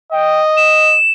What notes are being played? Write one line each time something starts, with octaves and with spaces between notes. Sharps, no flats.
D#5 G5
E7